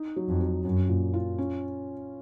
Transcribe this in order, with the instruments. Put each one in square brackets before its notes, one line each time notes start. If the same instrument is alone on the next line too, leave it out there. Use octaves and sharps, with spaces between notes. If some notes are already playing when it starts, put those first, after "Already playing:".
Already playing: [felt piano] D#4
F#3
[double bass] F2
[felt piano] F#3
[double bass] F#2 [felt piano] C#4
[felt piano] A#2
F4
C#4